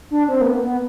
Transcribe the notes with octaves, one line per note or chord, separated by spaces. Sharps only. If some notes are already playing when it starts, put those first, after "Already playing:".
D4
C4
A#3
B3
B3